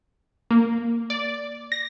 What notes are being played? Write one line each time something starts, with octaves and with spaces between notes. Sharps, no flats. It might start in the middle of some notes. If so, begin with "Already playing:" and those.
A#3
D5
A#6